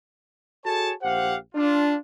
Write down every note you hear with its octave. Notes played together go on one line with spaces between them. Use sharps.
F#4 G#4 A4 C#5 A5
A#1 G4 C5 F5 F#5
D4 F4